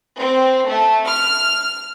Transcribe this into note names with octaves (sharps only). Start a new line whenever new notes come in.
C4
A3
F6